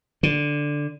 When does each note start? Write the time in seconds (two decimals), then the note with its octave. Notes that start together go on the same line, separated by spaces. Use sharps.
0.23 D3